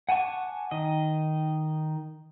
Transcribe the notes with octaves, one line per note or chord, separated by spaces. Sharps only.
F#5 G#5 A5 C#6 D6
D#3 D#5